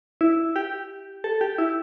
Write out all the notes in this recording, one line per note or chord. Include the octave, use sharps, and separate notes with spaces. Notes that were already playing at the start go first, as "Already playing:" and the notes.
E4
G4
A4
G4
E4